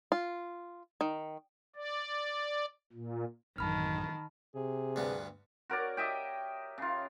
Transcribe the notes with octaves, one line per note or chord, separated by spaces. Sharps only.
F4
D#3
D5
A#2
A1 F#2 D#3 A5 B5 F6
C3 G#4
D2 G2 B3
F#4 A#4 C#5 D5
G4 D#5 E5 G5
C#3 F4